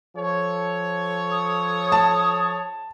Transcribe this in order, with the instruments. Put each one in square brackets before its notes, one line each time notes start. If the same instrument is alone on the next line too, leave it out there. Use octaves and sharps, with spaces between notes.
[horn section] F3 A4 C#5
[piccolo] D#6
[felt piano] A5